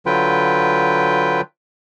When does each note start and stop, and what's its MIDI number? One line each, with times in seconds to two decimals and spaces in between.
0.06 1.41 50
0.06 1.41 54
0.06 1.41 65
0.06 1.41 71
0.06 1.41 79